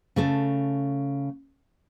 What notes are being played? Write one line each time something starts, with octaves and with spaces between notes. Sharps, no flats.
C#3 A3 A4